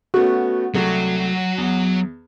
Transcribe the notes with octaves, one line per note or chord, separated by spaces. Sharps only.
A3 B3 C#4 F#4
C2 F#3 A3 F#5 C7
E2